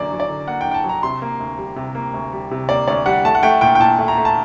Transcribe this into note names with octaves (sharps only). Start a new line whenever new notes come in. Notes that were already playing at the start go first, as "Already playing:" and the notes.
Already playing: F#2 D3 A#3 D5
F#3
D5
D3
A#3 F#5
G5
F#2
G5
A5
F#3
A#5
C3 C6
A#3
D2
G3
C3
A#3
D2
G3
C3
A#3 D5
D2 D5
G3 F#5
A3 A5
F#5
A3 G5
A#2 G5
G5
A#2 A5
A3
A#5
A3
A5